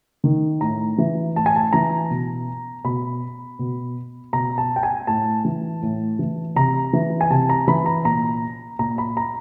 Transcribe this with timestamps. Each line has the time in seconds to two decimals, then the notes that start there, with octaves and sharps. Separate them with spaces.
0.24 D#3
0.61 A2 A#5
0.98 E3
1.36 A2 A5
1.46 G#5
1.56 A5
1.73 E3 A#5
2.10 B2
2.84 B2 B5
3.59 B2
4.33 B2 A#5
4.58 A5
4.76 G5
4.83 G#5
5.07 A2 A5
5.45 E3
5.82 A2
6.19 E3
6.56 C3 A#5
6.93 E3
7.21 G#5
7.31 C3 A5
7.49 A#5
7.67 E3 B5
7.86 A#5
8.05 A#2 A#5
8.79 A#2 A#5
8.98 B5
9.17 A#5